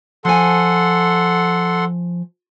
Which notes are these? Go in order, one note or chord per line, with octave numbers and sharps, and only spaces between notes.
F3 A4 F#5 G#5 C6